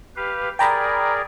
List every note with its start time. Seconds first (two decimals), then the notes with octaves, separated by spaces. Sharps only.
0.16 G4 B4 F5
0.59 G#4 A#4 D5 G5 A#5 B5